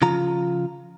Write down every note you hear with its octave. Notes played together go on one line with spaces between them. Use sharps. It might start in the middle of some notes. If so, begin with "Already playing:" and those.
C#3 F3 F4 A#5